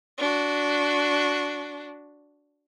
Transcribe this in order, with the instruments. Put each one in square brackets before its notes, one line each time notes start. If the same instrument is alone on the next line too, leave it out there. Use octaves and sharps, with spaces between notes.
[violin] D4 F#4